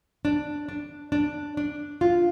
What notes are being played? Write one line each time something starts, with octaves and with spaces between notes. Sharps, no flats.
D4
D4
D4
D4
F4